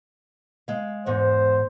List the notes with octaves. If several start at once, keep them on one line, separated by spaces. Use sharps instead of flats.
G#3 F5
E2 G#2 C5